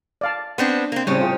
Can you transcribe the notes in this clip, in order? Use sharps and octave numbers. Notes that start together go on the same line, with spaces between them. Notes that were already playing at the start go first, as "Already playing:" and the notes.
D5 F5 A5
B3 C4 D4
A#3 C4
A2 C#3 G3 C4 C#4
C4 F4 G#4